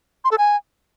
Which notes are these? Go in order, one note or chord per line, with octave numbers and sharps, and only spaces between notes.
C6
A4
G#5